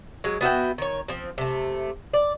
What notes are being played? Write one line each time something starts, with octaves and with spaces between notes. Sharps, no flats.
F#3 G#3
B3 F#4 E5 G5
D#3 C#5
F3 C4
C3 A3
D5